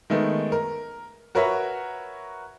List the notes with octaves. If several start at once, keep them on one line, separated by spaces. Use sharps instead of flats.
D#3 G#3 A3 B3
A#4
F#4 A#4 B4 C#5 E5